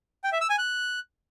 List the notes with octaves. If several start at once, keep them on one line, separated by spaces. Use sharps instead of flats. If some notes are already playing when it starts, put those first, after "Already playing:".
G5
E5
E6
G#5
F#6